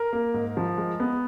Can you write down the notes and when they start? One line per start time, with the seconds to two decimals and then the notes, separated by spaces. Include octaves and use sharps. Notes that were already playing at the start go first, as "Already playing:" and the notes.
Already playing: A#4
0.13 A#3
0.34 G#2
0.57 F3
0.77 G#3
1.00 B3